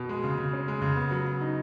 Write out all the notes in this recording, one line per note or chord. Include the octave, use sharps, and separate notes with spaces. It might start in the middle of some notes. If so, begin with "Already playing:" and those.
Already playing: B2
G#3
C#3
C#3
C#4
G#3
C#3
B3
F#3
F#3
D#4